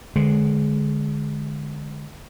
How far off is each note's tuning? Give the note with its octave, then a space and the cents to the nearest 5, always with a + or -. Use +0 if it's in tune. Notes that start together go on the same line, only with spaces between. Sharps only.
D3 +15 G#3 +10